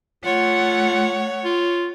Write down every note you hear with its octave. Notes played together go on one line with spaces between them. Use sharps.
A3 F4 C#5 F#5
F4